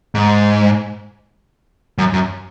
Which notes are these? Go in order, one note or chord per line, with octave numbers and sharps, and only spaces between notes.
G#2
F#2
F#2